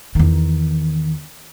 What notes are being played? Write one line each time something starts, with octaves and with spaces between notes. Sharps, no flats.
E2 D#3